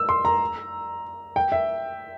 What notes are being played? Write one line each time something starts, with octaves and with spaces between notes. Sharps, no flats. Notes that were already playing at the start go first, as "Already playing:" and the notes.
Already playing: E6
C6
A#5
G5
E5